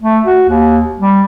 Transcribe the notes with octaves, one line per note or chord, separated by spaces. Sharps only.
A3
F#4
D#2
G3